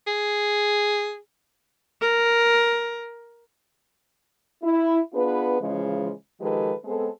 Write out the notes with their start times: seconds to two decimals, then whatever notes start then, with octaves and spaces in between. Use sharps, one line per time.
0.07 G#4
2.01 A#4
4.63 E4
5.13 B3 D4 F4 G#4 B4
5.60 C#3 E3 F3 G#3
6.41 D#3 F3 G#3 G4 A4 B4
6.85 G#3 B3 C4 G#4 A4